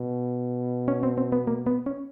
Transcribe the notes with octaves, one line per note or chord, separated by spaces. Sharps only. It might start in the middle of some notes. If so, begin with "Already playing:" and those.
Already playing: B2
C#4
C4
C4
B3
A#3
B3
C#4